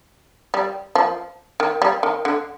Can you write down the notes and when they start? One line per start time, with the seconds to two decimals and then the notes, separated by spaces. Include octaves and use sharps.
0.54 G3
0.95 F3
1.60 D#3
1.82 G3
2.03 D#3
2.25 D3